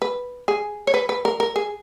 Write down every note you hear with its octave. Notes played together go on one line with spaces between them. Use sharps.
B4
G#4
C#5
B4
B4
A#4
A#4
G#4